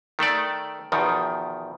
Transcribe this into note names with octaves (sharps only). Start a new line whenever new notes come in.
D#3 A3 A4 D5
E2 B2 D#3 F3